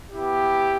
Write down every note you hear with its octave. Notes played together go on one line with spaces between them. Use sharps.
B3 E4 G4